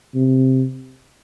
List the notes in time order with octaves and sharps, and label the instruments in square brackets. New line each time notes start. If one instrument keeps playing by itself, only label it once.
[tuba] C3